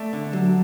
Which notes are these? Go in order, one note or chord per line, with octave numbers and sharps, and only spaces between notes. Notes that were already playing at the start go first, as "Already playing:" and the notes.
Already playing: A3 D5 E5
D3
F#3